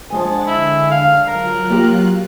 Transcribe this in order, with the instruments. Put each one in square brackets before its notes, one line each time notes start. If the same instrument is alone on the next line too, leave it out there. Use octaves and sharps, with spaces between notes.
[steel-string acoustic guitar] F3 G#3 G#5 [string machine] D4 F#5 A6
[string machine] D3 [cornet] E4
[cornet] F5
[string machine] F#3 F4 F#6 [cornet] A#4
[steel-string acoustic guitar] A#3 G4